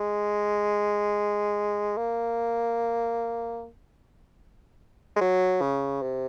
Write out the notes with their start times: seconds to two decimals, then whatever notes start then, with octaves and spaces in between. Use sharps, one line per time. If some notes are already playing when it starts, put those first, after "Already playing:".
Already playing: G#3
1.97 A#3
5.16 G#3
5.21 F#3
5.61 C#3
6.02 C3